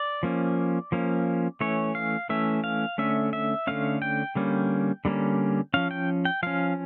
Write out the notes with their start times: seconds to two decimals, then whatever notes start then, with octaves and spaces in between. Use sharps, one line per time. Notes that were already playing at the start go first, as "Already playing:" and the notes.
Already playing: D5
0.23 F3 A#3 C#4
0.92 F3 A#3 C#4
1.61 E3 A3 C#4 C#5
1.95 F5
2.29 E3 A3 C#4 E5
2.64 F5
2.98 D3 A3 C#4 E5
3.33 E5
3.67 D3 A3 C#4 F5
4.02 G5
4.35 D3 G3 A#3 C#4
5.05 D3 G3 A#3 C#4
5.74 F3 C#4 F5
5.91 G5
6.25 G5
6.43 F3 C#4 F5